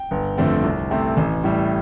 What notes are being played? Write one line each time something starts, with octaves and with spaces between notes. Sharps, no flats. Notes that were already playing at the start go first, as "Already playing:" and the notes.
Already playing: G5
G1
F2 D3 A3 C4
C2
C3 A3 C4
A1
A2 G3